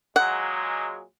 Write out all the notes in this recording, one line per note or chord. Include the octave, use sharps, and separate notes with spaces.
A#2 F#3 G#3 F#5